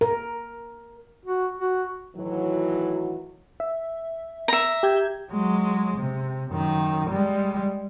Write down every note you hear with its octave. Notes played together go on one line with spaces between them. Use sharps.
A#4
F#4
F#4
A2 D#3 E3 F#3
E5
E5 A#5
G4 G6 G#6
F#3 G#3
C3
F#2 D#3
G3 G#3